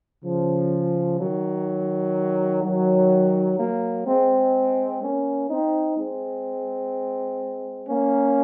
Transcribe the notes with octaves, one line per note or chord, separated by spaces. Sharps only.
C#3 F3
D#3 F#3
D#3 F#3
F#3 A#3
G#3 C4
A#3 C#4
C4 D#4
G#3 C4
A#3 C#4